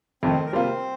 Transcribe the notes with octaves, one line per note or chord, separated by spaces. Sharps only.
F2 D#3 A3 C4 C5
A#4
C3 G3 A#3 C4 F4 C5